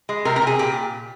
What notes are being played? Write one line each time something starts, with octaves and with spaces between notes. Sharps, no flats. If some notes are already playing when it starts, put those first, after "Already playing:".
G#3
C3 A#4
A#4
C3
G#4
A#2 G4